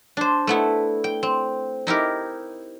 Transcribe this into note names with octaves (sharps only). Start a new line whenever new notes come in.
D4 C5
A3 B3 E4
G5
C4
D#4 E4 G4 A#4